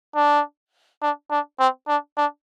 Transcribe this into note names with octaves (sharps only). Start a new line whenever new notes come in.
D4
D4
D4
C4
D4
D4